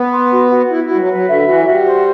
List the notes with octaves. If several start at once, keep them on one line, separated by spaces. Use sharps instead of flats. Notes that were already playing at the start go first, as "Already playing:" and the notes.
Already playing: B3
C6
F#4
F#4
E4 B4
E4
G3 F#4
F#3
F#3 B4
D3 E5
E3 F#4
F#3
G3 F#4
C5